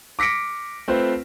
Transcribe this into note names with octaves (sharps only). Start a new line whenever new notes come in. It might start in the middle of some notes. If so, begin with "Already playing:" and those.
D6 A#6 B6 C#7 D7
A3 C4 F4 B4 C5